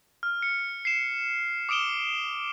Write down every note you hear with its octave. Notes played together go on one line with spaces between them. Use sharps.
F6
C#7
C7 E7
D6 D#6 D7 E7 G7